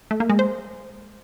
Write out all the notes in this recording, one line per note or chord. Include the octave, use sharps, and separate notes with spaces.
A3
A#3
G#3
C5